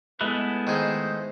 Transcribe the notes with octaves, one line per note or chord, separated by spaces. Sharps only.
G#3 A3 B3 E4 B4
D#3 G#4 C5